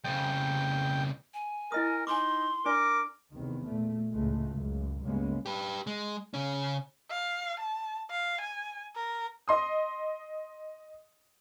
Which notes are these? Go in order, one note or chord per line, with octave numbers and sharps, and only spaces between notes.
F2 C#3 G5
G#5
E4 A#4 D#5 D#6
D#4 G#5 C6 D6
D4 A#4 D5 D6
E2 C3 D#3
A#2 A3
C#2 A2 G#3 A3
C#2 F#2
C#2 G2 G#3 A#3 B3 C#4
G4 B4
G#3
C#3 C#4
F5
A5
F5
G#5
A#4
D#5 C6 D#6